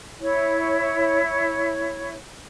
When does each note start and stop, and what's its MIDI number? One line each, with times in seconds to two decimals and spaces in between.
0.20 2.14 64
0.20 2.14 73